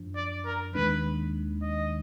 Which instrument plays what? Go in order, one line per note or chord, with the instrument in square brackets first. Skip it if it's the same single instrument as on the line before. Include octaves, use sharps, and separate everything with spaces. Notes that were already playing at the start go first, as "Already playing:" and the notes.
Already playing: [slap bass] F#2 F3 D4
[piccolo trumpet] D5
A#4
[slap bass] D#2 D#3 G#3 D4 [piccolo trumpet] B4
[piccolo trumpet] D#5